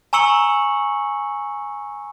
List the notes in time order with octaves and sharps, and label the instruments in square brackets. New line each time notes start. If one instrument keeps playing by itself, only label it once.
[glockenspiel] G#5 A#5 C#6 E6 C#7 F#7